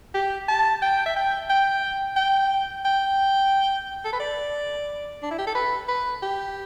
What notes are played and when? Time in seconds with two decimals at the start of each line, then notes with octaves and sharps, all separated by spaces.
0.14 G4
0.48 A5
0.82 G5
1.06 E5
1.16 G5
1.50 G5
2.16 G5
2.85 G5
4.05 A4
4.13 B4
4.20 D5
5.22 D4
5.31 E4
5.38 G4
5.47 A4
5.55 B4
5.88 B4
6.22 G4